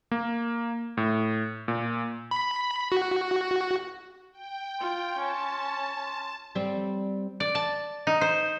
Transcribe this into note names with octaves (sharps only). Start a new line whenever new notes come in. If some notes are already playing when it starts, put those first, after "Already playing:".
A#3
A2
A#2
B5
F#4
G5
F4 C6
C#4 A5
C6
G3 C4
D5
A5
D#4
C5